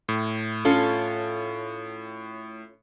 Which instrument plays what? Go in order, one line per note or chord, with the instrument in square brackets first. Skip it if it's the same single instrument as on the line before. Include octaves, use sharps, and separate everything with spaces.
[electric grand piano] A2
[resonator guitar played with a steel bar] C#4 F4 A4